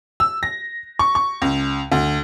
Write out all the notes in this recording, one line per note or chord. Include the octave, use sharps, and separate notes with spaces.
E6
A#6
C#6
C#6
C#2
D2